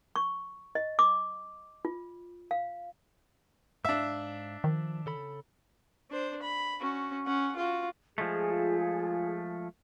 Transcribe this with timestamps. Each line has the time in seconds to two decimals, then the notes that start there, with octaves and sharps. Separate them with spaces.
0.16 C#6
0.75 D#5
0.99 D6
1.85 F4
2.51 F5
3.85 G#2 D4 E5 F5
4.64 D#3 F3
5.06 C#3 A4 B5
6.10 D4 C5
6.42 B5
6.80 C#4 F#4
7.26 C#4 F#5
7.56 F4 F#4
8.18 F3 G#3 A3 G#4
8.50 F4